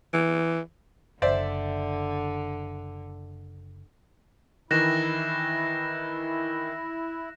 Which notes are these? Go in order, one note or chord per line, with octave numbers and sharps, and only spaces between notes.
E3
F#1 D3 C5 D5 E5
D#3 E3 E4 F#6 A#6 E7